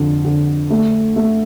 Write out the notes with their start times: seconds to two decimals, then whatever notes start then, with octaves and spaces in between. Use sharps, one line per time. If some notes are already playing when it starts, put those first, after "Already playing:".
Already playing: F2 D3
0.25 D3
0.70 A3
1.16 A3